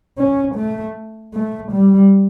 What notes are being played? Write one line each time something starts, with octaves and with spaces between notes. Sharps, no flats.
C#4
A3
A3
G3